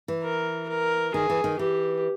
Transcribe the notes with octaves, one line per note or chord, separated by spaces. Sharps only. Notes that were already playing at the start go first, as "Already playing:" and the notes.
E3
A#4
A#4
D#3 G#4
E3
D#3
E3 G4